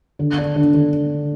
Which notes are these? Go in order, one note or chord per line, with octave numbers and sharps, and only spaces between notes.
D3
D4
D3
D3